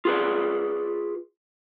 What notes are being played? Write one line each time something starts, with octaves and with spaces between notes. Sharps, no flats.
F4 G#4 B4 D5